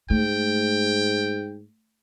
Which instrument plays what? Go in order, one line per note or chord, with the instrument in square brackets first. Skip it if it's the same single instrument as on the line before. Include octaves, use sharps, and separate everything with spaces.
[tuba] G#2 [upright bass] A3 [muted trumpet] G5